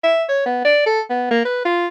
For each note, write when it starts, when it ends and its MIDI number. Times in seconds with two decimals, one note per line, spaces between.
0.04 0.24 76
0.29 0.41 73
0.46 0.64 59
0.65 0.82 74
0.86 1.01 69
1.10 1.30 59
1.31 1.42 58
1.45 1.65 71
1.65 1.87 65